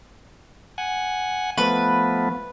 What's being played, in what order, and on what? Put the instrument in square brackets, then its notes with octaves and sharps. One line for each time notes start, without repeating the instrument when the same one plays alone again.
[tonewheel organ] F#5 G#5
[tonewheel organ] F3 A3 B3 [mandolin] B4